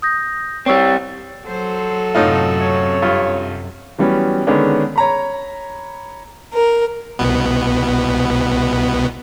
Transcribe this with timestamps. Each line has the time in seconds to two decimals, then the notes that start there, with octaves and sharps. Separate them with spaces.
0.02 D#6 G6 A#6
0.66 G3 C4 C#5 C#6 E6
1.47 F#3 A4 C5
2.15 F#2 A2 C3 D#4 F4
2.60 C#5
3.02 G2 F4
3.98 E3 F#3 G3 B3 C#4
4.47 D3 D#3 G#3 B3 C#4 D4
4.96 C#5 A#5 B5
6.53 A#4
7.19 C2 B2 B3